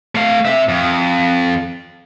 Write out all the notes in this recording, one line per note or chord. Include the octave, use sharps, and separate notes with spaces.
A3 F5
C3 E5
F2